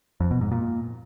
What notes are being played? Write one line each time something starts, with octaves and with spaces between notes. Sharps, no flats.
F2
B2
G#2
A#2